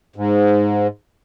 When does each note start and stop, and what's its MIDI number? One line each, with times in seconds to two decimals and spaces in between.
0.16 0.87 44